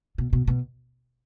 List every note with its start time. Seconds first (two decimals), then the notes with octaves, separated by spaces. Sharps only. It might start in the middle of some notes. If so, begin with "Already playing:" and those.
0.18 B2
0.33 B2
0.47 B2